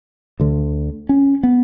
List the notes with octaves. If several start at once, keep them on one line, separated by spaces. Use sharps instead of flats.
D2 D3
C#4
B3